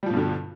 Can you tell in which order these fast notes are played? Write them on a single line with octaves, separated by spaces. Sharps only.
G3 F3 B2 G2 D3